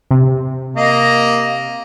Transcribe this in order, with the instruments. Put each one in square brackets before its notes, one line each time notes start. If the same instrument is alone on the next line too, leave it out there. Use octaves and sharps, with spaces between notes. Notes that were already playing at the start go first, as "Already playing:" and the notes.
[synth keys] C3
[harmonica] A#3 D#5